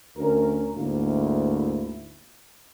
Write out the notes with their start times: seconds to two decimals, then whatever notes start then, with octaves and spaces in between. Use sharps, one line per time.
0.17 D2 C#4 A#4
0.75 D2 G#2 A#3 E4